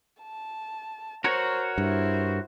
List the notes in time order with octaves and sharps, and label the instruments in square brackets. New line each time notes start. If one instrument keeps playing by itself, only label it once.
[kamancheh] A5
[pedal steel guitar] F#4 A#4 C#5 [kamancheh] C5
[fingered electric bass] G2 [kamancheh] E4 C5